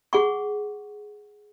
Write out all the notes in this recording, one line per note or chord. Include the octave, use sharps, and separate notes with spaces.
G#4 F#5 C#6